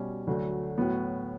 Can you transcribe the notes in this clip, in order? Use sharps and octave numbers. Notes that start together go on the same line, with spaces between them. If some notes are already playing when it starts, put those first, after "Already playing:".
Already playing: B2 G3 C#4
D2 D3 F#3 A3
A2 F#3 B3